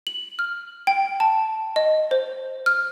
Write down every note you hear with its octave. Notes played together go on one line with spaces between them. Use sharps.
F#7
F6
G5
A5
D#5
C5
F6